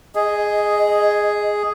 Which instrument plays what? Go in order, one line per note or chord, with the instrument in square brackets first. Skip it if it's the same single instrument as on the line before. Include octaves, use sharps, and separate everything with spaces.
[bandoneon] G#4 [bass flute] D#5